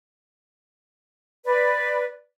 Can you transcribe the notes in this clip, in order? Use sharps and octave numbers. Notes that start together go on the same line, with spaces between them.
B4 D5